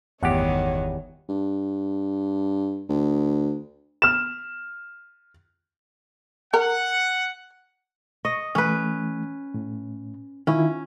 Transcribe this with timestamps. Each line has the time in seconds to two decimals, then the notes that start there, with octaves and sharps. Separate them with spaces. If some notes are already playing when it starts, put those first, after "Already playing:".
0.23 G1 E2 A2 D#3 G3 G4 C#5 F#5
1.29 G2
2.89 D2
4.02 F6 E7
6.54 A#4 F#5
8.25 D#5 C#6
8.55 E3 A3 C#4 B4
9.54 A2
10.47 D#3 C#4 E4 F4